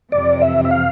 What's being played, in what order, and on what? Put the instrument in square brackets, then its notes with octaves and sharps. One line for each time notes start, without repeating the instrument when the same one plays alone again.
[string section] F2 C3 E3 [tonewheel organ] D5
[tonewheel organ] E5
E5
F5